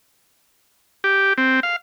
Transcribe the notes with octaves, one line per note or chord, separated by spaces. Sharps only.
G4
C4
F5